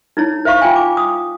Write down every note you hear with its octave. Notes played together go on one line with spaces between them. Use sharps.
D#4 E4 C#5
C5 E5 F5 C#6
F4 G5 G#5
D6
D#6